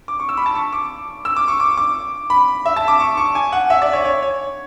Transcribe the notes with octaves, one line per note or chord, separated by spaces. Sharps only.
D6
C#6
E6
B5
A5
C#6
D6
E6
D6
C#6
D6
D6
B5
E5
A5
D6
C#6
C#6
G#5
F#5
E5
D5
C#5
C#5
C#5